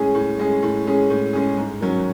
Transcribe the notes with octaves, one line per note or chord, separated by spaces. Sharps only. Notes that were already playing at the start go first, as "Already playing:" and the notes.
Already playing: A2 G#3 C#4 G#4
A2
G#3 C#4 G#4
A2
G#3 C#4 G#4
A2
G#3 C#4 G#4
G#2
D#3 F#3 C#4